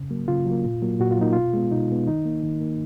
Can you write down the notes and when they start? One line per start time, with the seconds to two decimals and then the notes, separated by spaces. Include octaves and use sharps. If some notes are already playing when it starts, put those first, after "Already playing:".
Already playing: C#3
0.11 F#3 A#3
0.28 C#3 F4
0.46 F#3
0.51 A#3
0.64 A#2
0.82 F#3 A#3
1.00 A#2 F#4
1.11 F4
1.18 F#3 A#3 D#4
1.33 B2 F4
1.53 G#3 B3
1.71 B2 D#4
1.90 G#3 B3
2.07 D#3 D#4
2.25 A#3
2.43 D#3
2.61 A#3